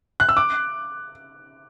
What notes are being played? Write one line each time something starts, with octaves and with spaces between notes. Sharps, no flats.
F#6
E6
D6